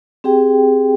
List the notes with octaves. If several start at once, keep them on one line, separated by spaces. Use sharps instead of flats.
C4 G4 G#4 G5